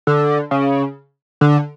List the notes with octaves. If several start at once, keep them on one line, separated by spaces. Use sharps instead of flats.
D3
C#3
D3